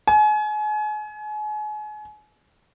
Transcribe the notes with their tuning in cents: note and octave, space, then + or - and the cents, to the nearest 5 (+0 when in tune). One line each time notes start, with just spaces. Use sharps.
G#5 +35